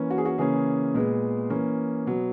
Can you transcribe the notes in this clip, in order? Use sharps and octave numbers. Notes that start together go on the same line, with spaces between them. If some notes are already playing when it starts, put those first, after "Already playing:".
Already playing: E3 A#3 C#4
F#4
G#4
F#4
C#3 E3 A#3 C#4 G#4
A#2 G#3 B3
E3 A#3 C#4
B2 F#3 B3